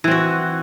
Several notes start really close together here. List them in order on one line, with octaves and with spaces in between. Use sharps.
E3 C4 F#4